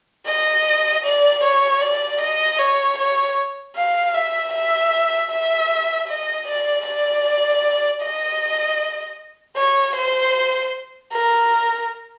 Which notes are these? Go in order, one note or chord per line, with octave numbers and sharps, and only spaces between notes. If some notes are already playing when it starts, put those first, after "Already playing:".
D#5
D5
C#5
D5
D#5
C#5
C#5
F5
E5
E5
E5
D#5
D5
D5
D#5
C#5
C5
A#4